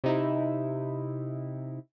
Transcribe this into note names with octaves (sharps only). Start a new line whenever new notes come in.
C3 D#4 E4